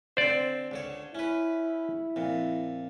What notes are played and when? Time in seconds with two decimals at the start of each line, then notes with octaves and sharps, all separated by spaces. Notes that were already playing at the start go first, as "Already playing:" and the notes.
0.17 D3 C4 C5 D5
0.71 C#2 D3 C#5
1.15 C#4 E4 B4
2.16 F2 A#2